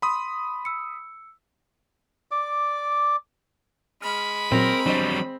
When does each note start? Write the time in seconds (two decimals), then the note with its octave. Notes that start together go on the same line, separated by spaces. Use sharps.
0.02 B5 C6 D#6
0.65 E6 C#7
2.31 D5 D6
4.02 G#3 B5 F6
4.52 A#2 F#3 C4 A#4
4.86 F#3 G3 D4 C5 D#5